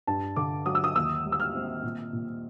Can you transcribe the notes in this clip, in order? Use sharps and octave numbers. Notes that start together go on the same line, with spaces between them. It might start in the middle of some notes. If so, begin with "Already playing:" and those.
G2 A5
D3 D6
F#3 D#6
E6
D#6
D#2 E6
G3
E6
F6
C4
A#2
A#2